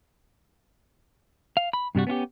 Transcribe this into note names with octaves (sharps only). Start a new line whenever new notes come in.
F5
B5
G2 C3 G3 F#4
B3 C#4 F4 G4